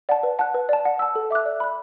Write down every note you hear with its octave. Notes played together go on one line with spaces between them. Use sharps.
D5 F#5 A5
B4
F#5 A5 F#6
B4
D5 A5
F#5
A5 E6
A4
E5 D6 F#6
D5
B5 F#6